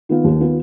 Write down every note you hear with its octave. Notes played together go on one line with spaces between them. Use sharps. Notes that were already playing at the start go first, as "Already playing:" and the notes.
D#3 B3 F4
D#2
D#3 B3 F4